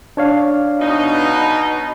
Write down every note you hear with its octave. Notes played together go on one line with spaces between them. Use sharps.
D4 C#5 F5
B2 D#4